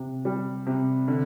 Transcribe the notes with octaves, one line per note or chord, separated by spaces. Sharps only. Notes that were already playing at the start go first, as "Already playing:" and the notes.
Already playing: C3
G3
C3
D3